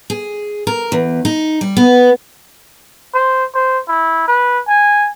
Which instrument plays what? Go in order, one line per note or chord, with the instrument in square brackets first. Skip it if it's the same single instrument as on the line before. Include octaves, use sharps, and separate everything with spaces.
[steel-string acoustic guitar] G#4
A#4
E2
D#4
G3
B3
[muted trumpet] C5
C5
E4
B4
G#5